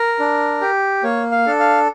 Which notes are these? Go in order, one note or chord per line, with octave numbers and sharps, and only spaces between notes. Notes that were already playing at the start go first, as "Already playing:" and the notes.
Already playing: A#4
D4
G4
A#3 C#5
F5
D4 A4
F5